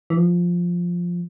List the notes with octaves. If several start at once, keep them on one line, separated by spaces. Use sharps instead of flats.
E3
F3